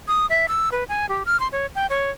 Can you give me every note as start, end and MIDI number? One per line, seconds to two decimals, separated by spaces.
0.08 0.26 87
0.30 0.46 76
0.48 0.69 88
0.72 0.84 71
0.89 1.06 80
1.09 1.23 67
1.26 1.39 89
1.40 1.48 84
1.52 1.66 73
1.75 1.87 79
1.90 2.10 73